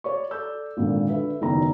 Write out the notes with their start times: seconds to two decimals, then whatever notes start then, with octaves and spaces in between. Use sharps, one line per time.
0.04 C#5 D5 C#6
0.31 A4 D5 E6 G6
0.77 G#1 F2 A#2 D3
1.09 D3 B4 E5
1.41 F#1 E2 D#3 B3 D5 A#5